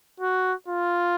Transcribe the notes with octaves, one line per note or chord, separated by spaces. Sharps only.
F#4
F4